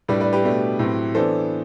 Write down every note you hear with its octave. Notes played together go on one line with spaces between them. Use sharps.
A2 G3 D4 B4 D5
B4 D5
G4 B4
B2 A3 D4
A2 F#3 C4
E3 B3 D4 A4 C5